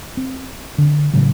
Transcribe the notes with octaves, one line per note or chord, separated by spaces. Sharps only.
C4
D3
A2 C#3 E3 F#3